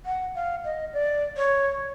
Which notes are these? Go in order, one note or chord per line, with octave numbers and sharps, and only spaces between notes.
F#5
F5
D#5
D5
C#5